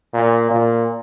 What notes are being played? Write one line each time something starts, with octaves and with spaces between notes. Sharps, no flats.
A#2
A#2